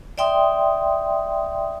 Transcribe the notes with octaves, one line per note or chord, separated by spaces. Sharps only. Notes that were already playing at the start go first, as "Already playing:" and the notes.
D5 E5 G5 C6 D#6